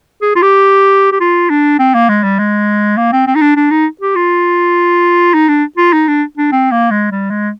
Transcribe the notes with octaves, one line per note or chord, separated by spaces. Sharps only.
G#4
F4
G4
G4
F4
D4
C4
A#3
G#3
G3
G#3
A#3
C4
C4
D#4
D4
D4
D#4
G4
F4
D#4
D4
F4
D#4
D4
D4
C4
A#3
G#3
G3
G#3